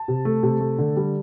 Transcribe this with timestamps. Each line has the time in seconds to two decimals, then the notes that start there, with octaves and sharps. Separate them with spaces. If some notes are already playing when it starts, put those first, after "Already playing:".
Already playing: A5
0.08 C3
0.25 A3
0.43 C3
0.60 A3
0.79 D3
0.96 G3